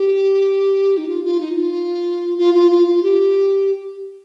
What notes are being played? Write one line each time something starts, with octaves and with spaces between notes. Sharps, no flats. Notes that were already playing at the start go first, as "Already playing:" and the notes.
Already playing: G4
D#4
F4
F4
D#4
F4
F4
F4
F4
F4
G4